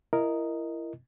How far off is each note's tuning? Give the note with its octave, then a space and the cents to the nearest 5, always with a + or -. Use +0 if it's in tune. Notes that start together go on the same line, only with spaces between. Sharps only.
E4 +25 A#4 +0 D#5 +0